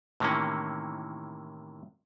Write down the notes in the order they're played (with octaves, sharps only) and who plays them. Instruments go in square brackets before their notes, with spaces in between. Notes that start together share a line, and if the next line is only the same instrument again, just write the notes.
[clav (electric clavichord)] A2 C3 D#3 E3 A#3 C#4